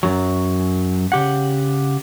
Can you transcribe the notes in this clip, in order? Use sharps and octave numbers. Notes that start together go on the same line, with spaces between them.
F#2 F#3
C#3 G4 F#5